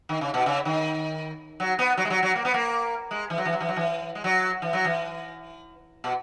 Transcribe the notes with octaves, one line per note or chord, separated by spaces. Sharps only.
D#3
C#3
B2
C#3
D#3
F#3
B3
F#3
G#3
F#3
F#3
A#3
B3
A#3
G#3
E3
F#3
E3
F#3
E3
F#3
E3
G#3
F#3
E3
F#3
E3
B2